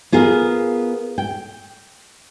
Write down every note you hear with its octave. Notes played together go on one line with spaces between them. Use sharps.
B3 F4 G#4 A#4
G5